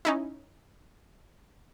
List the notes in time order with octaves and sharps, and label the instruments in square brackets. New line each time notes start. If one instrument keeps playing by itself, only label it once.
[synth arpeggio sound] C#4 D#4 E4